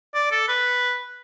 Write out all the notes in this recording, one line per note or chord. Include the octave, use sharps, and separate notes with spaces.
D5
A4
B4